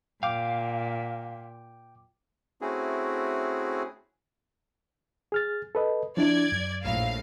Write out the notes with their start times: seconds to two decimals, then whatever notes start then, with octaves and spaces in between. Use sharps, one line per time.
0.23 A#2 F5 G5 D6
2.61 A3 C4 C#4 E4 F#4 G#4
5.32 G#4 F6 A6
5.75 A4 B4 D#5
6.17 F3 D4 E4 D5 G#6
6.52 F#2
6.83 A#1 A2 F5